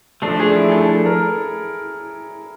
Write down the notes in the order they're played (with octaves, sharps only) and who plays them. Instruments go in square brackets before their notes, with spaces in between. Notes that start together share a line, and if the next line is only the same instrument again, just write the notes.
[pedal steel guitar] F3 A3 D4 [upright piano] A4
[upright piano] G#4
E4
A4
A4
A#4